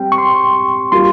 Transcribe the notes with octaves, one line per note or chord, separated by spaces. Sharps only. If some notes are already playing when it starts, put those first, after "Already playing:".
Already playing: G3 C4 G5
C#6
C6
G3 A#3 F4 C6